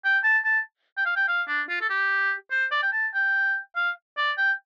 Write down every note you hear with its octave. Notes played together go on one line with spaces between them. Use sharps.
G5
A5
A5
G5
F5
G5
F5
D4
F4
A4
G4
C5
D5
G5
A5
G5
F5
D5
G5